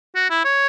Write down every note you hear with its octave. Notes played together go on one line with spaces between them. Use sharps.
F#4
E4
C#5